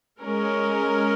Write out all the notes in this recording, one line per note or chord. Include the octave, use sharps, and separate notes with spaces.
G#3 C#4 A#4